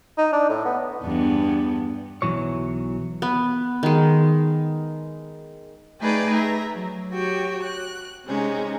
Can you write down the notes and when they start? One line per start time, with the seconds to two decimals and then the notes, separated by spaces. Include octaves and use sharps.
0.18 D#4
0.33 D4
0.49 A2
0.65 B3
1.02 E2 G2 B3
2.22 B1 E2 E3 F#3 C#5
3.22 B3
3.83 D#3 G#3
6.02 A3 D#4 G#4 B4 D5 G5
6.34 E5 A#5
6.73 F#3
7.14 F#4 G4 C#5 G5
7.64 F#6
8.27 C3 G#3 C#4 D#4